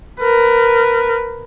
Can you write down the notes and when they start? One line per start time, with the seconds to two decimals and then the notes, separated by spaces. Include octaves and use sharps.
0.19 A#4 B4